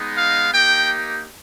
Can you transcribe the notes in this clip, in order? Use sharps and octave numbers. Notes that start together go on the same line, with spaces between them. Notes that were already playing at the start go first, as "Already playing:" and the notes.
Already playing: G#3 B3 D#4
F5
A#3 D#4 G4 G5